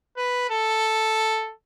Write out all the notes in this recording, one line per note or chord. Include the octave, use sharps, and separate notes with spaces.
B4
A4